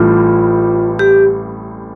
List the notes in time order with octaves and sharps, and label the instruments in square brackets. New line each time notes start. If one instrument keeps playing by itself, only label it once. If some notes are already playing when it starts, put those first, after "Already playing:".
Already playing: [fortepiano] A1 A2 G3 [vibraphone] F4
[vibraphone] G4